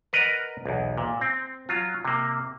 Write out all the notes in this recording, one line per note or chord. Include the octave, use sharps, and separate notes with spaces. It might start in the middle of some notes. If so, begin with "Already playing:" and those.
A#4 B4 D5 D#5 F#5 A#5
B1 E2
A#2
C4
F#3 F4
C3 A#3